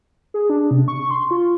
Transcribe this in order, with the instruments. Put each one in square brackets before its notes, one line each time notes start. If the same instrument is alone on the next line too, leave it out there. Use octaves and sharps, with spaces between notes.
[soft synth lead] G#4
D4
C3
C#6
C6
F4